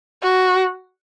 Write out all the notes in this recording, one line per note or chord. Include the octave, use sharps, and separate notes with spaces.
F#4